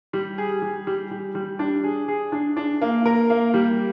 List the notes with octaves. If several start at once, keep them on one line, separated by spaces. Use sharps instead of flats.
G3
G#4
G3
G3
G3
G3
D4
G#4
G#4
D4
D4
A#3
A#4
A#3
G3